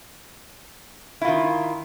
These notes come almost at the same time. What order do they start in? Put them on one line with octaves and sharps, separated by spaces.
E4 F4 D#3